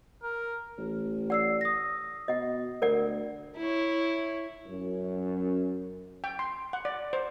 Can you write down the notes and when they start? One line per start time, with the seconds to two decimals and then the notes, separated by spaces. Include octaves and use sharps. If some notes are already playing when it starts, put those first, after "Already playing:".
0.23 A#4
0.78 A1
1.30 D5 F#5 E6 C7
1.61 D#6 A#6
2.28 B2 D#5 F#5
2.82 D2 A#4 D5 F#5
3.57 E4 C#5
4.66 F#2
6.24 G5
6.39 C6
6.73 F#5
6.85 D5
7.13 C5